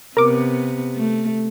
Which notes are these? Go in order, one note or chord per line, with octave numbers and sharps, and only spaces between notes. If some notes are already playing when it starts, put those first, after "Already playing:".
C3 B3 A#4 D6
A3